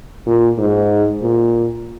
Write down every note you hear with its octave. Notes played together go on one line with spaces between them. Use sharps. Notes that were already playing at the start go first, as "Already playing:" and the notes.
A#2
G#2
A#2